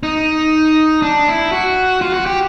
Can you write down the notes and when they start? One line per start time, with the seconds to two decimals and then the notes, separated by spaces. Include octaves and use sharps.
0.03 D#4
1.02 D4
1.28 E4
1.52 F#4
2.01 F4
2.14 F#4
2.26 G4